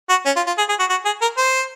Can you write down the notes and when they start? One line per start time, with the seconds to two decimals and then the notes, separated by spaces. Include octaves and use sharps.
0.10 F#4
0.26 C#4
0.36 F4
0.47 F4
0.58 G#4
0.69 G#4
0.79 F#4
0.89 F#4
1.05 G#4
1.21 A#4
1.37 C5